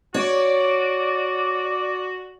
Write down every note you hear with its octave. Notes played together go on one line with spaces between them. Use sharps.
F#4 C#5 D5